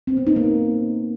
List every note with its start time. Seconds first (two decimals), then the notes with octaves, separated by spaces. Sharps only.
0.07 C4
0.17 B3
0.27 D#4
0.36 A#3